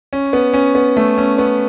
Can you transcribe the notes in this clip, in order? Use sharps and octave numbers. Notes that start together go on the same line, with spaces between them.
C#4
B3
C#4
B3
A3
C#4
B3